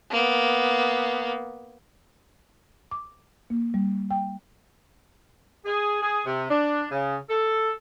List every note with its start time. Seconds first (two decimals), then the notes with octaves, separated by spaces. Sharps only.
0.11 A#3 B3
2.91 D6
3.50 A#3
3.74 G3
4.11 G5
5.65 G#4
6.01 G#4
6.25 C3
6.50 D4
6.91 C#3
7.29 A4